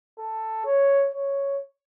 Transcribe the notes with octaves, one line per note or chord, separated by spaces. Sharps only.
A4
C#5
C#5